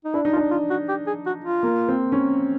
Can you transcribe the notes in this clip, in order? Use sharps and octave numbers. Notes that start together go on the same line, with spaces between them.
D#4
D4 E4
D#4
F4
D4
F4
F#4
G4
G#4
F#4
F4
A#3
C4
C#4